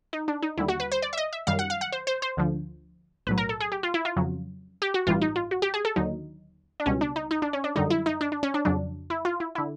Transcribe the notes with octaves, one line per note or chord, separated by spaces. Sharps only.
D#4
D4
D#4
D#2 D3 G3 E4
F#4
B4
C5
D5
E5
D#5
E5
F#2 D#3 G3 F5
F#5
F5
F#5
C5
C5
C5
D2 D3 F3
B1 A2 F#3 B4
A#4
A4
G#4
G4
F4
E4
F4
F2 C#3 F#3
G4
F#4
A1 G2 E3 G3 F4
D#4
F4
F#4
G4
G#4
A4
D#2 D3 F#3 D#4
D4
C#2 B2 G3 C#4
D4
D#4
D#4
D4
C#4
D4
F#2 D3 G3 D#4
E4
D#4
D4
D4
C#4
D4
F2 C#3 F#3 D4
E4
F4
E4
D3 E4